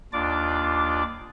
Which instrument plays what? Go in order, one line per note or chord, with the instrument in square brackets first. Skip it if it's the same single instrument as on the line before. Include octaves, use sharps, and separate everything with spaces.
[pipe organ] D#2 D4 F4 D5 D6